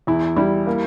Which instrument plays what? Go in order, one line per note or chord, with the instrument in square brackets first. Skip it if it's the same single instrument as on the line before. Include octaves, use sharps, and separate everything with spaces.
[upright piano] E2 [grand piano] E4
[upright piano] G3 [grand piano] E4
[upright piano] A#3